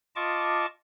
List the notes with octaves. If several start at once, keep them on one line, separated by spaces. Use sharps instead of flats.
F4 D#5 A5 C#6 D6